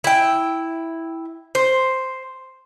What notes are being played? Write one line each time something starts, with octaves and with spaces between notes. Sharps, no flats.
E4 G5
C5